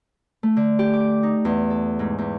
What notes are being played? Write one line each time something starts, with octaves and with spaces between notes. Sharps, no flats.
A3
D3
G4
D6
D#4
E2
A4
G#2
E2